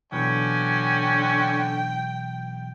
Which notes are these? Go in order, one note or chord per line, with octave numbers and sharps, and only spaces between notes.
B2 D3 E3 F#3 C#4 G5